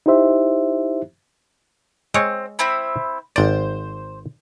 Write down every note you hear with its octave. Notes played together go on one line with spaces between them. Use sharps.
D#4 E4 G4 C5 E5
G#3 C4 C#5
C4 E4 B5
G#1 C5 D5